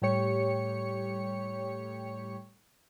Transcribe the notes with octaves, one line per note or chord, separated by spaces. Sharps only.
A2 G3 G4 C#5 C#7